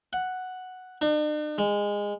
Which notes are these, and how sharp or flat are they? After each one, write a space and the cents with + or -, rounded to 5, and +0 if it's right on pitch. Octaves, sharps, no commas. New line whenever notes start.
F#5 +0
D4 +45
G#3 -20